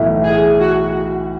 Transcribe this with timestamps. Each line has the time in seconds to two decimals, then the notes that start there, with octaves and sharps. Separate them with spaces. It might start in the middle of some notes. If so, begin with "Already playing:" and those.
Already playing: B1 A2 E3 A3 E4
0.24 G#4
0.59 F#4